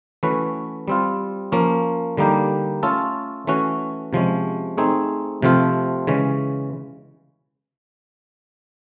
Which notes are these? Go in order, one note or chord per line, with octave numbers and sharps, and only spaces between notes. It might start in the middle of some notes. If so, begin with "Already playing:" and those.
E3 A3 C#4 F#4 B4
G3 C4 F4
F3 A#3 C#4
D3 G3 A#3 D#4 G4
A3 C#4 F4 A4
E3 A3 C#4 F#4
C3 F3 G#3 C#4
A3 C4 D#4 G#4
C3 F3 A3 C4 F4
C#3 E3 G#3 C#4